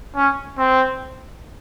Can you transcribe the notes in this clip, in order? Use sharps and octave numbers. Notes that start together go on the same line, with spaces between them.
C#4
C4